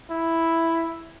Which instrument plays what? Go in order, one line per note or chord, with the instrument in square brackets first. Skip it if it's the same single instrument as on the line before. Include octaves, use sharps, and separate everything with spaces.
[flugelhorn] E4